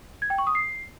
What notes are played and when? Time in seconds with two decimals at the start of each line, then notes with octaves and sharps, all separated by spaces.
0.22 G#6
0.30 G5
0.38 C#6
0.47 D#6
0.55 C7